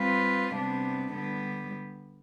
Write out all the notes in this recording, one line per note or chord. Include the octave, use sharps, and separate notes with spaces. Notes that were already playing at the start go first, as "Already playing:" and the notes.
Already playing: G3 C4 F4 B4
C3 G3 B3 D4
D3 G3 B3